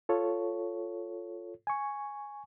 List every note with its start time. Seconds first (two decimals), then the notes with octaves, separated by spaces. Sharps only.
0.09 F4 A4 C#5
1.67 G#5 C#6